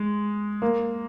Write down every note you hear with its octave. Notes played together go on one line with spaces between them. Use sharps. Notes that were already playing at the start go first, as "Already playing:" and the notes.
Already playing: G#3
A#3